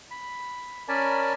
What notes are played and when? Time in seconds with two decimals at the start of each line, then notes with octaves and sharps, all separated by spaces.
0.11 B5
0.88 C#4 A#4 D5 G#5 A5 B5